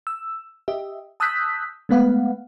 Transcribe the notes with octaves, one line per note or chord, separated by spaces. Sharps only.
E6
G4 D#5 E5
A5 D#6 E6 F#6 G6 B6
G#3 A3 B3 B4 F5 F#5